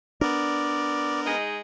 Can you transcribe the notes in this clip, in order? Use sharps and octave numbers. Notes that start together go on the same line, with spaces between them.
B3 D4 A#4 D5
G#3 D#4 G#4